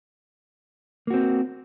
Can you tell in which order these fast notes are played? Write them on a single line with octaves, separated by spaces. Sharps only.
A#3 F#4 C4